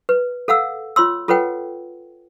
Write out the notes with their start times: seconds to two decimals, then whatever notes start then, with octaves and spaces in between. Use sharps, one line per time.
0.09 B4
0.48 A4 F5 F#5 E6
0.96 F4 C#5 C6 E6
1.28 F4 A4 B4 C#5 F#5 G5